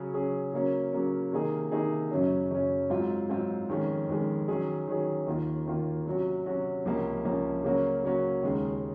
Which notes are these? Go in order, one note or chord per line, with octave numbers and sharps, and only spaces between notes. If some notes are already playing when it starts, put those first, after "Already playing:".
Already playing: C#3 F#3 C#4 G#4
C#3 F#3 C#4 G#4
C#3 F#3 A#3 C#4
C#3 F#3 A#3 C#4
C3 D#3 A#3 D#4 G#4
C3 D#3 A#3 D#4 G#4
F#2 C#3 F#3 C#4
F#2 C#3 F#3 C#4
G#2 F#3 C4 F4
G#2 F#3 C4 F4
F2 D#3 G#3 C#4
F2 D#3 G#3 C#4
D#3 F#3 C#4 G#4
D#3 F#3 C#4 G#4
D#2 D#3 A#3 F4
D#2 D#3 A#3 F4
C3 F#3 C#4 F#4
C3 F#3 C#4 F#4
C#2 C3 F3 A#3 C#4
C#2 C3 F3 A#3 C#4
C#3 F#3 A#3 C#4 F#4
C#3 F#3 A#3 C#4 F#4
D#2 C#3 G#3 D#4